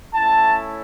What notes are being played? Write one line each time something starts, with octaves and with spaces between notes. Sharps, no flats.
A3 C#4 E4 A5